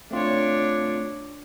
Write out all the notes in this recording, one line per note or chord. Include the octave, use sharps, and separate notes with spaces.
A3 C4 D4 F4 C#5